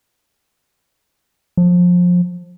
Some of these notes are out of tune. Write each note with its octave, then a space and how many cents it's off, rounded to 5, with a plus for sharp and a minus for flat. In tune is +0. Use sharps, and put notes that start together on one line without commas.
F3 +25